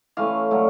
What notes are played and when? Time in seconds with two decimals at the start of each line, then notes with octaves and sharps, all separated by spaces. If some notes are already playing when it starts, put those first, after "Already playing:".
0.17 E3 A3 C#4 F5
0.51 D3 F#3 A3 C#4